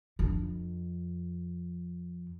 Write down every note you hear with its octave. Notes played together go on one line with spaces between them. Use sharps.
F2 D4